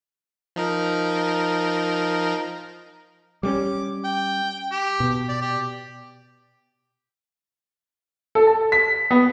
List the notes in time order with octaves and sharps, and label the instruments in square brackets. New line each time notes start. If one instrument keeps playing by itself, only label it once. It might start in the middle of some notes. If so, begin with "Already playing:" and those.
[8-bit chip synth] F3 D#4 A#4
[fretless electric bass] G3 G#3 C#4 [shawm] D6
[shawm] G5
G4
[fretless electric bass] B2
[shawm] D5
G4
[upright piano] A4
A5
B6
B3